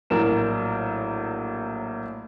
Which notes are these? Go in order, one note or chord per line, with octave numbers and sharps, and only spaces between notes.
A#1 A2 F#3 A#4 E7